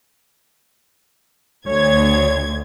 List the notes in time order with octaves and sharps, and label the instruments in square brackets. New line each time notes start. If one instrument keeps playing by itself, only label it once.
[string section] D2 G#6 [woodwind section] C#5